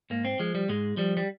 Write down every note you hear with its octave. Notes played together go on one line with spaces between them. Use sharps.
G#2 A#3
C4
F3 G#3
G3
G#2 G#3
F3 G3
G3